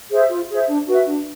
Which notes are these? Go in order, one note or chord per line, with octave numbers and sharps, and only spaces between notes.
G#4 C5 E5
F4
G#4 C5 E5
D4
F#4 B4 E5
D4